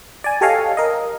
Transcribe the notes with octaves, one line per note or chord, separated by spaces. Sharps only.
D5 G#5
G4 A4 C#5 D#5 F5 G#5
A#4 D#5